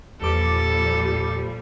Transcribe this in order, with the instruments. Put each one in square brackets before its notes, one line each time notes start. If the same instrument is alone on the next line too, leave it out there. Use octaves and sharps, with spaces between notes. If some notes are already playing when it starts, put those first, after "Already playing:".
[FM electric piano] E2 D6 [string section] A#2 F3 G3 [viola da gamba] A4